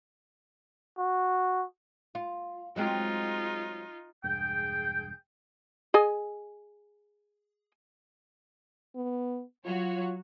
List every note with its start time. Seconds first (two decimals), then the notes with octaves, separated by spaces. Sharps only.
0.98 F#4
2.15 F4
2.76 F#3 G#3 C4 D#4 F4
4.24 E1 G2 G#4 G5 G6
5.94 G#4 D#5 G#5
8.96 B3
9.66 F#3 F4 F#4 C#5